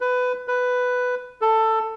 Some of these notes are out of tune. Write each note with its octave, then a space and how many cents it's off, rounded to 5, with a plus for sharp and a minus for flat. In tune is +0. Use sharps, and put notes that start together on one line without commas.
B4 +20
B4 +10
A4 +15